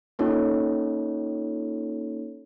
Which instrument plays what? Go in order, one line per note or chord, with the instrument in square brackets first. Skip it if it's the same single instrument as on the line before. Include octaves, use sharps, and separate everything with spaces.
[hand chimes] A#3 C#4 D#4 F4 A4 C#5